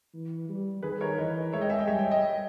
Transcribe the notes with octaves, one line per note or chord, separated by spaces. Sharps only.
E3
G3
D#3 G#4 B4
A#4 C#5
E3 B4 D#5
G#3 C#5 E5
D#5 G5
E5 G#5
D#5 G5
G3 C#5 E5
D#5 G5
D#5 G5